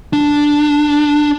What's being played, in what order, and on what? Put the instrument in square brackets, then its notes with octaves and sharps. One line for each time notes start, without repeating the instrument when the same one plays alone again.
[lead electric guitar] D4